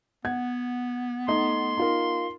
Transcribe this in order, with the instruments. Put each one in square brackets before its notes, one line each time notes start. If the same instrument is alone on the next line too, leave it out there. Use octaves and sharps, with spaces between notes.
[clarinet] B3 [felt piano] F#5 G#6
[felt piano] A3 D#4 D#5 [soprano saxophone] C6
[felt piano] D#4 F4 A#4